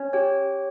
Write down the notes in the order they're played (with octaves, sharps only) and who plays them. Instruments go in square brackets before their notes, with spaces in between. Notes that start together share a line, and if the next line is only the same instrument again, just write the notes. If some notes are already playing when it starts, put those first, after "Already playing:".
Already playing: [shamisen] C#4
[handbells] G4 C#5 G5